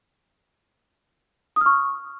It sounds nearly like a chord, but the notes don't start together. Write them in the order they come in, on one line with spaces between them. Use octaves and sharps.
D#6 F6 C#6